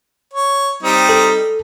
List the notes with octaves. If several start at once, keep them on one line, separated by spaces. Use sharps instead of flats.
C#5
G3 C4 D#4
A4